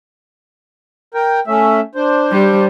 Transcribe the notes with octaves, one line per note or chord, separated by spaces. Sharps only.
A#4 G5
A3 C#4 E5
D4 C5
G3